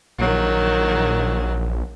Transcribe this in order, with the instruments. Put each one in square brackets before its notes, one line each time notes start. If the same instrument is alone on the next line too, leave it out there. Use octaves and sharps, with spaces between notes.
[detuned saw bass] A#1 [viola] D#3 F#3